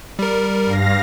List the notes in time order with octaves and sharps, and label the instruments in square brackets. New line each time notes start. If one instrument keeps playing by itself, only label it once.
[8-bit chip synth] G3 A#4
[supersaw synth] G2 F5 A#6